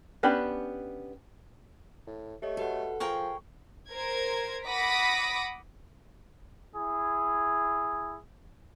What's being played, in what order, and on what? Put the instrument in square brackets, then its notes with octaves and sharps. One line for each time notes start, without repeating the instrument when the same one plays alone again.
[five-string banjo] B3 C#4 D4 G4 B5
[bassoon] A2
[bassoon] A3 [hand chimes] G4 C#5 D#5
[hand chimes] F#4 B4 F#5 [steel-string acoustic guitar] A4
[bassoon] F3 [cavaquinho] G#4 A#4 G5 [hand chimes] C#6
[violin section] A#4 C5 G#6
F#5 B5 D6 D#6 A#6 B6
[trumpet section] E4 G#4